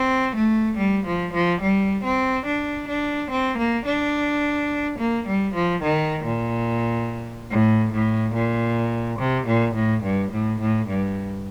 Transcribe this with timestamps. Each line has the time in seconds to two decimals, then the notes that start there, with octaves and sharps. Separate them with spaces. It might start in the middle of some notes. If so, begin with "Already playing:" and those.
Already playing: C4
0.36 A3
0.77 G3
1.06 F3
1.34 F3
1.61 G3
2.04 C4
2.46 D4
2.88 D4
3.31 C4
3.58 A#3
3.86 D4
4.99 A#3
5.27 G3
5.55 F3
5.83 D#3
6.25 A#2
7.51 A2
7.93 A2
8.35 A#2
9.19 C3
9.47 A#2
9.75 A2
10.04 G2
10.32 A2
10.61 A2
10.88 G2